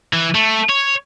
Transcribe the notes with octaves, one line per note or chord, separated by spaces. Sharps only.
E3
A3
C#5